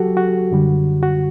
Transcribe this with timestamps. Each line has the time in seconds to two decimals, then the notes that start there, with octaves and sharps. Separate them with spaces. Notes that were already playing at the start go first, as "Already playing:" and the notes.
Already playing: F#3 F#4 G4 A4
0.17 F#4
0.51 F#2 D3 G3
1.03 F#4